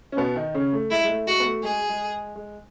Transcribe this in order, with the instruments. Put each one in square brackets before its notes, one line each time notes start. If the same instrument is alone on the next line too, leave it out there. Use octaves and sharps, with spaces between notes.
[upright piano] C#4
B2 B3
D#3 D#4
C#3 C#4
A3
[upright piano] G#3 [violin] E4
[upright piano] G#3
A3
[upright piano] G#3 [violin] F#4
[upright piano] B3
A3
[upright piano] G#3 [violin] G#4
[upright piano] G#3
G#3